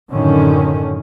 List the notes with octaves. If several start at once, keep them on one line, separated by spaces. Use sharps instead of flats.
F#2 A2 D3 D#3 C#4